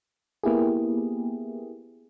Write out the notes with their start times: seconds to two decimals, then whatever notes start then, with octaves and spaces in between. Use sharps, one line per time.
0.43 A#3 B3 E4 G4 G#4